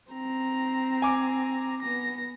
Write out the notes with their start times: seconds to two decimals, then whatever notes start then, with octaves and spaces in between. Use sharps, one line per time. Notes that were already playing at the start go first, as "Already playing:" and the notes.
0.12 C4 A#5
1.02 G#5 D6
1.82 B3 A#6